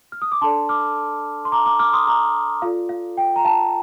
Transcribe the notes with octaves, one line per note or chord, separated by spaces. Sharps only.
F6
D#6
D6
D4 A4 D5 A5 C6
D6 F6
C6
A#5 D6
A#5 D6
D6 F6
C6 D#6
A#5 D6
F4 A4 D5 F5
F5
G5
A#5
F5 A5